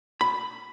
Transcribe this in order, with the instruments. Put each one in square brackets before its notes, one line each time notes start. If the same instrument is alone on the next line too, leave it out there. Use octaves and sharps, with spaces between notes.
[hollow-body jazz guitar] B5